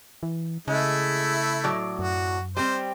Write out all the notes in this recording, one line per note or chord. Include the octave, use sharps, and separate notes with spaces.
E3
C#3 G#3 A3 E4
A2 F#3 D5
F#2 F#4
G3 C4 C5